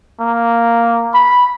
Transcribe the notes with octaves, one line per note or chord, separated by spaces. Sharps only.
A#3
B5